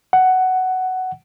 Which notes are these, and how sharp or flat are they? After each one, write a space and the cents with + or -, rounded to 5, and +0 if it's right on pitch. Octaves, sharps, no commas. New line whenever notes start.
F#5 +10